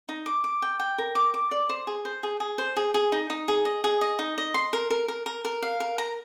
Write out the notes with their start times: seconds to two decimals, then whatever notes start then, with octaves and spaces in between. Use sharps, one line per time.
0.09 D#4
0.26 D6
0.44 D6
0.62 G5
0.80 G5
0.98 A#4
1.15 D6
1.34 D6
1.51 D5
1.69 C5
1.87 G#4
2.05 C5
2.23 G#4
2.40 G#4
2.58 C5
2.76 G#4
2.94 G#4
3.12 D#4
3.30 D#4
3.48 G#4
3.65 D#5
3.84 G#4
4.01 D#5
4.19 D#4
4.38 D#5
4.54 C6
4.73 A#4
4.90 A#4
5.08 A#4
5.26 A#4
5.45 A#4
5.63 F5
5.80 A#4
5.98 A#5